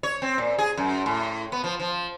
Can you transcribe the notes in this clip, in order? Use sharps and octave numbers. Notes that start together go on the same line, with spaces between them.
C#5
C4
A#2
G#4
F#2
A2
B3
F3
F3